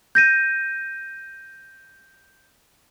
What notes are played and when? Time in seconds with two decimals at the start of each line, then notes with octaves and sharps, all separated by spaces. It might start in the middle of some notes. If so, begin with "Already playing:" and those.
0.15 G6 A#6 D#7